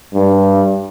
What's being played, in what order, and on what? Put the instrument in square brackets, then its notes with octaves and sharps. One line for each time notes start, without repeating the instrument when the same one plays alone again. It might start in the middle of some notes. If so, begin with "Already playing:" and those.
[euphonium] G2